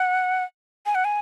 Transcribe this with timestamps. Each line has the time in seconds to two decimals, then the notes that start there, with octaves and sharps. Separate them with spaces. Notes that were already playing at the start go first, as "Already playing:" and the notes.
Already playing: F#5
0.86 G#5
0.95 F#5
1.05 G#5